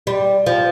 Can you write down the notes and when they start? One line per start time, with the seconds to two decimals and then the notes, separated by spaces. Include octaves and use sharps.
0.07 G3
0.46 F3